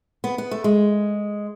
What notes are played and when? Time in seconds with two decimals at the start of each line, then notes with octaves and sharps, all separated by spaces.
0.24 B3
0.38 B3
0.51 A3
0.64 G#3